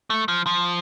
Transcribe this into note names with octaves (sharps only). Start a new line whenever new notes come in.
A3
F3
F3